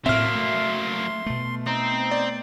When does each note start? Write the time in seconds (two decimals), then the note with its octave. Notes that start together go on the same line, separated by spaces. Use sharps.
0.06 A2 F#3 A#3 C4 E5 C6 F6
0.35 A3
1.26 B2 A3
1.67 C4 D#4
2.11 D5